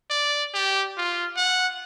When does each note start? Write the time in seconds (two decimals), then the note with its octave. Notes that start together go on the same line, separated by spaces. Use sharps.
0.10 D5
0.54 G4
0.98 F4
1.37 F#5